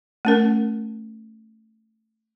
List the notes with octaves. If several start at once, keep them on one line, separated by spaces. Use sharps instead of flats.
A3 C#4 A#4